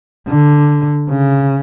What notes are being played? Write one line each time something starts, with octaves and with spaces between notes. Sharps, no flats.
D3
C#3